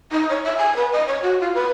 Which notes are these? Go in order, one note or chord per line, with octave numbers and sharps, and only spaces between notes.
D#4
C#5
E5
G#5
B4
D#5
C#5
F#4
F4
B4